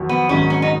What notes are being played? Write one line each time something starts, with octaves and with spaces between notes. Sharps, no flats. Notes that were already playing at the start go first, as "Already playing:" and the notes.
Already playing: F2 D#3 F#3
B3
G#2 D#3 F#3 C#4
C#4
D#4